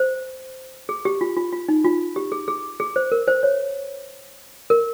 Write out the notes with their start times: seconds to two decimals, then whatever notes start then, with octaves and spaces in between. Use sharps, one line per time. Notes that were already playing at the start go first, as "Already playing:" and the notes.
Already playing: C5
0.89 G#4
1.05 G4
1.21 F4
1.37 F4
1.53 F4
1.68 D#4
1.85 F4
2.16 G4
2.32 G#4
2.48 G#4
2.80 G#4
2.96 C5
3.12 A#4
3.28 C5
3.43 C#5
4.70 A#4